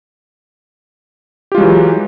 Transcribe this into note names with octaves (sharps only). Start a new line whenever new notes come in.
E3 F#3 G#3 F4 G4